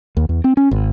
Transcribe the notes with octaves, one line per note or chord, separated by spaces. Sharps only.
D#2
E2
C4
C#4
G#1